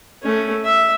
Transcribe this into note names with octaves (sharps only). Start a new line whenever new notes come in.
A3 C#4
E5